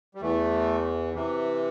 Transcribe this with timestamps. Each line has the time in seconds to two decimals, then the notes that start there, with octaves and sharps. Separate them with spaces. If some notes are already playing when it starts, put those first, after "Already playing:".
0.15 G3
0.21 E2 E3 A3
1.14 C3 E3